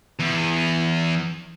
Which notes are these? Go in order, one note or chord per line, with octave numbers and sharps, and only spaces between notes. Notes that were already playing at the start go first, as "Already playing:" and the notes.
E2